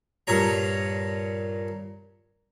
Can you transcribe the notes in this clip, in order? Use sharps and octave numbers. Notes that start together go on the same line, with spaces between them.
G2 A#2 C#5 A#5